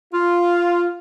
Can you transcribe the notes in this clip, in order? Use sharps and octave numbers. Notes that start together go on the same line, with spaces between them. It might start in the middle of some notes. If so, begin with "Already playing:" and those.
F4